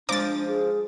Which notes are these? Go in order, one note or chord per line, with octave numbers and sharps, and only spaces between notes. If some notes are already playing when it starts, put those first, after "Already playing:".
F3 G#3 D4 A#5 D6 A6
G#4